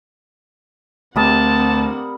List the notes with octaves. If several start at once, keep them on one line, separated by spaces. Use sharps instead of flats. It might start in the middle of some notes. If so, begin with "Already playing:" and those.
D2 G3 A3 A#3 C4 F#5 A5 D#6